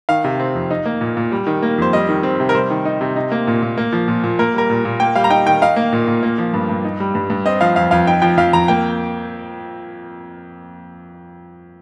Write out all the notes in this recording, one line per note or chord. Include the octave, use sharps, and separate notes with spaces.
D#3 F5
C3
C4
F2
D#4
A#3
A#2
A#2
G3
D#3
A#3
F2 C5
G3 D#5
D#3
C4
C3
A#4
G3 C5
D#3
D#4
C3
D#4
A#3
A#2
A#2
A#3
F3
A#2
A#2
A#3 A#4
G3 A#4
A#2
A#2
A#3 G5
G3 F5
A#5
D#4 G5
D#3 G5
D#4 F5
A#3
A#2
A#2
A#3
F3
G2
G2
D#4
G3
G2
G2
C4 D#5
F3 F5
F2 F5
F2 F5
D#4 G5
F3 G5
F2 F5
F2 A#5
A#3 G5